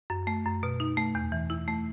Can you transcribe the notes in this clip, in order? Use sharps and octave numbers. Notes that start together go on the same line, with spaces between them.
F#2
A3
F#2
B2
D#4
A3
E2
E3
E4
A3